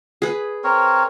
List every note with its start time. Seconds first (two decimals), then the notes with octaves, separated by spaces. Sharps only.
0.22 G#4 B4
0.64 C4 A#4 C#5